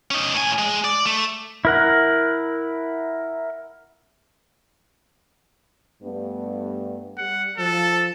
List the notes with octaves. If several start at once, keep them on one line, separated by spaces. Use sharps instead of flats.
C#4 D#4
A2 G#5
G#3
D5
A3
E4 A#4 F#5
G2 A3 B3
G3 F#5
F3 A4